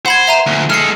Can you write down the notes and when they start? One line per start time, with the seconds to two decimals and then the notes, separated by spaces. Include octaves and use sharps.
0.06 C5 F#5 B5 G#6
0.27 E5 A#5 D#7
0.46 D2 A#2
0.70 G#3 A4 F6 C7